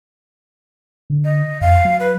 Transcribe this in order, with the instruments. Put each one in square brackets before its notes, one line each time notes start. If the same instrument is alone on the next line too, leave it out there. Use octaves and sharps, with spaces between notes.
[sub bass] D3
[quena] D#5
[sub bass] F2 [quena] F5
[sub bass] F#3
[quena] B4